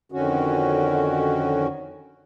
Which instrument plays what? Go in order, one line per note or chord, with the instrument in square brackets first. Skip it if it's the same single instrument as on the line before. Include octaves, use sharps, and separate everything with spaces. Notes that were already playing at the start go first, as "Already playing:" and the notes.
[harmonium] F2 D3 D#3 C#4 F#4